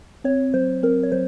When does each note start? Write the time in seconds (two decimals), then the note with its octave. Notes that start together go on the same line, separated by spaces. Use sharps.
0.24 C4 C#5
0.54 F#3 C5
0.83 C4 A#4
1.03 C#5
1.12 F#3 C5